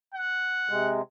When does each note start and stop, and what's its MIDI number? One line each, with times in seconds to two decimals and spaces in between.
0.15 0.92 78
0.70 1.01 48
0.70 1.01 56